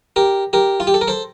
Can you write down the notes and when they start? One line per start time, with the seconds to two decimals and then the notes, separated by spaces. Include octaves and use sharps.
0.16 G4 A#4
0.53 G4 A#4
0.80 F4
0.87 G4
0.94 A4
1.01 A#4
1.08 A4 C5